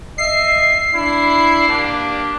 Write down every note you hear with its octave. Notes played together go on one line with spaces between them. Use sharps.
D#5 E5 C7
D4 E4
A#3 D4 G4